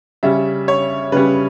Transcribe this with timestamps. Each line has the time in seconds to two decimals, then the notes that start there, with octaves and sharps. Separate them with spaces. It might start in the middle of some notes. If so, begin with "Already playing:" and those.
0.23 C#3 G3 C#4 E5
0.68 C#5
1.12 C#3 G3 C#4 B4